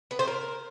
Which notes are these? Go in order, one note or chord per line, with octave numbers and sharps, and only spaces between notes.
B3
C5
A#4